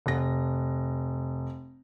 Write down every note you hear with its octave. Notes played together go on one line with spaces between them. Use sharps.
F1 A#6